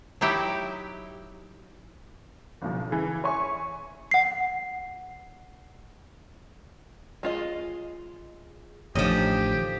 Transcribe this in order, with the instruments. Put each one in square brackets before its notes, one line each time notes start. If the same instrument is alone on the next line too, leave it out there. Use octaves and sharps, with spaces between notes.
[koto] F#3 D#4 E4 G4
[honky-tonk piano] F#1 B1 F3
C#3 E3
C#5 E5 G#5 C#6
[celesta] F#5 C7
[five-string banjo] G#3 F4 D#5
[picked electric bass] A1 A2 D3 [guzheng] F3 D#5 [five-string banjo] C#4 D#4 [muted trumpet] G4